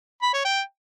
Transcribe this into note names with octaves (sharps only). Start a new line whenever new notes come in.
B5
C#5
G5